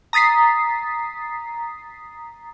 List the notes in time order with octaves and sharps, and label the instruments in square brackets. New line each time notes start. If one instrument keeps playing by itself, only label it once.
[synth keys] A#5 D#6 A6 B6 C7